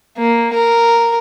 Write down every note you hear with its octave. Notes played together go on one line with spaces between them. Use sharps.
A#3
A#4